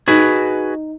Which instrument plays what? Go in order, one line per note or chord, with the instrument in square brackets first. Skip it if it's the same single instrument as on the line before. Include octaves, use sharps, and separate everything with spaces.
[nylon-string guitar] D#4 [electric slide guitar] F#4 G#4 B4